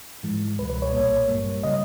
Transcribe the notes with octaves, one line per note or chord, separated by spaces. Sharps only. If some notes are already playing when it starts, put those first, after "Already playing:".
G#2 E3 G#3
C#2 B2 G3 B4
B4
C#5
B1 A#2 A#3
G#1 G2 G3 A#3
C#3 G3 D#5